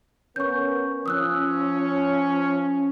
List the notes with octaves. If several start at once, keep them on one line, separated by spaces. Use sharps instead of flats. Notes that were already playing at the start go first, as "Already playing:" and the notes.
B3 C#4 A#4 C#6 G6
F3 C#4 D#6 E6 F#6